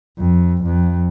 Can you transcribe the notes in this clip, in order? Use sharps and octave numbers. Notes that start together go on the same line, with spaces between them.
F2
F2